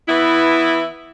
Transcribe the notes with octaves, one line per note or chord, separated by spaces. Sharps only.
E3 B3 E4